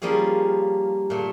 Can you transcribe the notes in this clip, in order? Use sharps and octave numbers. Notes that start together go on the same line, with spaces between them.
F3 G3 A#3 C#4 G#4
A#2 A3